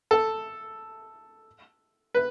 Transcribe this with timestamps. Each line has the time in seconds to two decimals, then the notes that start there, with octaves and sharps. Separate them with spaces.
0.11 A4
2.14 B4